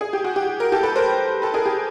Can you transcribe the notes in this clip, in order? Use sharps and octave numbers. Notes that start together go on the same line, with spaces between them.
G#4
G4
F#4
G4
A#4
G4 A4
A4 B4
A#4 C5
A4 B4
G#4 A#4
G4